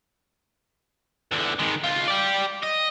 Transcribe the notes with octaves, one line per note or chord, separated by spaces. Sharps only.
E2 D3
D#3 G#3
C#2 F4
G4 D5
D#5